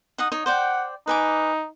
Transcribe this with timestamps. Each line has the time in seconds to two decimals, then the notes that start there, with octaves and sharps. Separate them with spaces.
0.18 D#4 F#5 D#6
0.32 D#4 C#5
0.46 C5 D5 F#5 G5
1.07 D#4 B4 G#5 D6